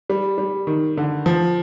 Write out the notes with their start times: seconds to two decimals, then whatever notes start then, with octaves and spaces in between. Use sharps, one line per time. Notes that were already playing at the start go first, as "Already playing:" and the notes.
0.10 G3
0.38 G3
0.67 D#3
0.97 D3
1.26 F3